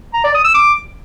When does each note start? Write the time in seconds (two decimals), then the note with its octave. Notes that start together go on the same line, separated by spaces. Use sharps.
0.14 A#5
0.24 D5
0.34 D#6
0.44 E6
0.54 D6